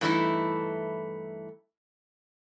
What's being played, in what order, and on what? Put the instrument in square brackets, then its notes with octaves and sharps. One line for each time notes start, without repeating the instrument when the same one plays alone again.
[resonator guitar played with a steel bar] G2 E3 A3 D#4 E4